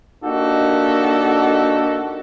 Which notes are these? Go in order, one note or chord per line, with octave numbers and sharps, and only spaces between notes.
A#3 D4 D#4 F#4 G4 A4